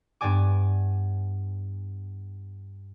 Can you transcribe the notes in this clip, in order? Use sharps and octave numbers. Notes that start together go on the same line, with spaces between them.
G2 B3 D5 G#5 D6